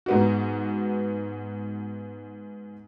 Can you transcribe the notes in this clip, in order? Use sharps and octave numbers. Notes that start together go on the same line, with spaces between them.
G#2 B3 F#4